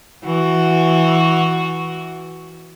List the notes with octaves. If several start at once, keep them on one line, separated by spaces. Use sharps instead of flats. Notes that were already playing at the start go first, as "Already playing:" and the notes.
E3 F#4